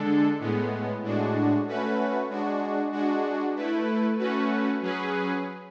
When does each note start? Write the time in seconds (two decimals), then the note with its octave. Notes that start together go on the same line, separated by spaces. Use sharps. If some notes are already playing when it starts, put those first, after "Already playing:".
Already playing: D3 G#3 D4 A4
0.40 A2 G#3 B3
1.03 A2 G#3 D4 F#4
1.67 A3 C#4 F#4 B4
2.29 G#3 D4 F#4
2.92 G#3 D4 F#4
3.56 A3 E4 B4
4.18 A3 C#4 F#4 B4
4.81 F#3 C#4 G#4 B4